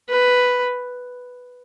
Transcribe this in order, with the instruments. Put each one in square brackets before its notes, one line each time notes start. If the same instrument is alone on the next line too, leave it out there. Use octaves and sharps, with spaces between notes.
[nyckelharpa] B4